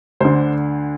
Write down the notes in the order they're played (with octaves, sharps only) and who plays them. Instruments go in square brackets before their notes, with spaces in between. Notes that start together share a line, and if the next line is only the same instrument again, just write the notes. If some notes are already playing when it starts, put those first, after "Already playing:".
[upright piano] D2 D3 C5